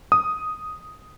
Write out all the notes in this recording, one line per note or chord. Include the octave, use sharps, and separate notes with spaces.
D#6